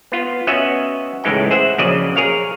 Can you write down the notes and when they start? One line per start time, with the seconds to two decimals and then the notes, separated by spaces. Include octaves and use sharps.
0.12 B3 F4
0.47 B3 C#4 F#4 D#5 E5 F#5
1.24 C#2 A2 E3 G#3 D#4 G5
1.51 G#4 C5 E5 F#5
1.78 A#1 C#3 F#3 D5 D#5
2.16 G#4 A#4 C#5 F5